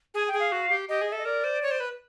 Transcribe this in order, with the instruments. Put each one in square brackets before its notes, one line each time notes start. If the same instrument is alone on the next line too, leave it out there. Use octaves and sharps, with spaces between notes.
[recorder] G#4 [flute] G#5
[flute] G5
[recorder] G#4
[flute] F5
[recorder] F#4
G4
[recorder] G4 [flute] D#5
[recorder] G#4
[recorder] A4 [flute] E5
[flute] D#5
[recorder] A#4 [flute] D5
[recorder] C5
C#5
C5
B4